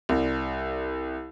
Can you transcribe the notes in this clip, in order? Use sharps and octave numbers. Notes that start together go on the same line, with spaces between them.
C2